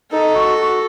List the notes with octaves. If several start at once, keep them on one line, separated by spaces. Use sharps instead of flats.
D#4 A4
F#4
F#4